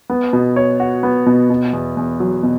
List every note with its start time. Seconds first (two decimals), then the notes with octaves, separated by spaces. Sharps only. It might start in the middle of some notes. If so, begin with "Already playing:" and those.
0.10 B3
0.33 B2
0.56 C#5
0.80 F#4
1.03 B3
1.26 B2
1.50 B2
1.73 E2
1.97 E2
2.20 F#3
2.43 B2